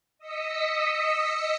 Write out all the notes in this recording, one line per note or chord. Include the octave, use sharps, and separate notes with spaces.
D#5 D#6 E6 B6 C#7